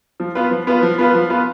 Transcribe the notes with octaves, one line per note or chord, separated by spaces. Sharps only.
F3
B3 F4 B4
F3
B3 F4 B4
F3
B3 F4 B4
F3
B3 F4 B4